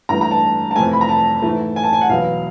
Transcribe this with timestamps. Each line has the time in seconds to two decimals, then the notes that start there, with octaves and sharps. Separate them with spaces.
0.09 G2 E3 A3 A#5
0.21 A#5
0.31 A5
0.71 A5
0.76 F2 C3 E3 A3 G#5
0.93 B5
1.01 A#5
1.09 A5
1.42 G#2 E3 A3
1.76 G#5
1.83 A5
1.93 G#5
2.01 F#5
2.09 E2 B2 F#3 B3 F5